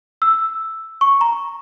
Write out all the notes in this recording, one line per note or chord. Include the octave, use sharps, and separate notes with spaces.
E6
C#6
A#5